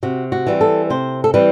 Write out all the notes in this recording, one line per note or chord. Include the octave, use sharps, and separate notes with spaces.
C3 F#4
F#4
E3 G3 C4
A4
C3 C5
A4
E3 G3 C4 B4